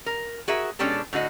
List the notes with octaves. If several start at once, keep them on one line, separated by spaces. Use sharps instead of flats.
A#4
F#4 G#4 A#4 E5
B2 G#3 C#4 D4 G4 A4
A2 D3 F#4 D#5